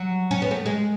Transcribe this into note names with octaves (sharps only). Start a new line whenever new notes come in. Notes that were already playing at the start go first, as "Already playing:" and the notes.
Already playing: F#3
C#4
B3
A3
G#3